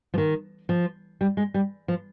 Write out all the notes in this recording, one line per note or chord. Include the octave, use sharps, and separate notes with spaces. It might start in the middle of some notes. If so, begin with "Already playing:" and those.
F3
D#3
F3
G3
G#3
G3
F3